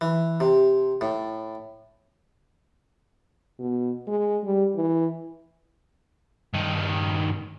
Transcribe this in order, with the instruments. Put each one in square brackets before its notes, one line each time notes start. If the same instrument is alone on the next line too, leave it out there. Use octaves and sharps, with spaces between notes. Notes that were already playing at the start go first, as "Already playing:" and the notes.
[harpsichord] E3
C3
A2
[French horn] B2
G#3
G3
E3
[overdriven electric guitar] G2 D#3